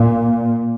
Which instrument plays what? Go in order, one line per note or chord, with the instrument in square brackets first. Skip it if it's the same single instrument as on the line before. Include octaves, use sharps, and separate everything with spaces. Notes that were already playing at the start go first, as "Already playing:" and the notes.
Already playing: [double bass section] A#2